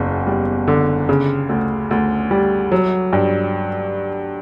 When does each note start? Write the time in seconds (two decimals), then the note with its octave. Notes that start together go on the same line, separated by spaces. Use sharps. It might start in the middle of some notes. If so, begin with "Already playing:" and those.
Already playing: F#1 E2
0.27 G3
0.68 D3
1.09 C#3
1.49 D2
1.91 D2
2.31 G3
2.72 F#3
3.13 G2